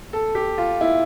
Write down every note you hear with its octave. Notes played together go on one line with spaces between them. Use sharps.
A4
G4
F4
E4